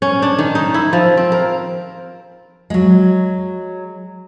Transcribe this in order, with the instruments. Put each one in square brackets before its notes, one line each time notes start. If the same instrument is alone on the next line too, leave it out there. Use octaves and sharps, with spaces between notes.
[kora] C#4
D4
D#3
D#4
E4
F3
C4
A#4
[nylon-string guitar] F#3 G#3